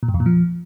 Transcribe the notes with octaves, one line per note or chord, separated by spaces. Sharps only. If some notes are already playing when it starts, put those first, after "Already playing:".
A#2
G2
F2
A#2
F3